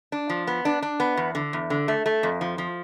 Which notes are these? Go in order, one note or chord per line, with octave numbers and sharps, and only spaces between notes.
D4
F3
B3
D4
D4
B3
E2
D3
E2
D3
A3
A3
F2
F3
F3